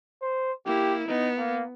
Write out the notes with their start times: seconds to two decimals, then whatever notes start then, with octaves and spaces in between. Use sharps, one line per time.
0.21 C5
0.66 A#3 E4 G4
1.08 B3 D#4
1.37 A#3